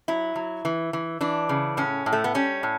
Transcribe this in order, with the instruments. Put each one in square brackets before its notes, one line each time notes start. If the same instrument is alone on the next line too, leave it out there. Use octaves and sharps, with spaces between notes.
[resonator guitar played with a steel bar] F#3 E4
F#3
E3
E3
E3 D4
C#3
A2 C#4
A2
A3
B3
G3 C#4
A2